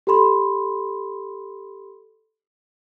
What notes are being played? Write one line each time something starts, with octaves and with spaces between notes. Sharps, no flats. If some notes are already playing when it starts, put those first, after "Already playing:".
G4 A4 B5 C6